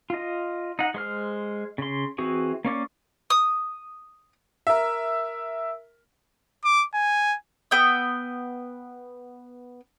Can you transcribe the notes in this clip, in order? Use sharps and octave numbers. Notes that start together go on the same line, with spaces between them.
F4 D#5
D#4 F#5
G#3 C5 F6
C#3 C6
E3 C4 F#4 G#4
A#3 C#4 D5 C#6
D#6
A#4 E5
D6
G#5
B3 G5 E6